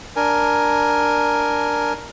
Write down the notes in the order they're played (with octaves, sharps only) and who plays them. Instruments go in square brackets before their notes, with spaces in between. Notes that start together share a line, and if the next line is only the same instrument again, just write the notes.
[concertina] D4 A#4 G#5